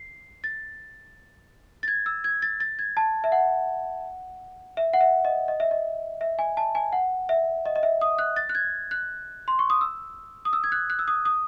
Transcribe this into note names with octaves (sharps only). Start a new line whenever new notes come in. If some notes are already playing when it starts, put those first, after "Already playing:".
Already playing: C7
A6
A6
G#6
E6
G#6
A6
A6
G#6
A5
E5
F#5
E5
F#5
E5
D#5
D#5
E5
D#5
E5
G#5
A5
G#5
F#5
E5
D#5
D#5
E5
D#6
F#6
A6
F#6
G#6
F#6
C6
C#6
D#6
E6
D#6
E6
G#6
F#6
F#6
E6
D#6
D#6